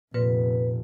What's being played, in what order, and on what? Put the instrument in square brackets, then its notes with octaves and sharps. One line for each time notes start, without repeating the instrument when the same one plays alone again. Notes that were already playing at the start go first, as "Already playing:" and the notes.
[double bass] F1 [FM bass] A#2 [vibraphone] B4